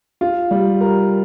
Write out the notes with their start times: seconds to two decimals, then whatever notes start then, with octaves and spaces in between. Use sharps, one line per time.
0.21 F4
0.51 G3
0.81 A#4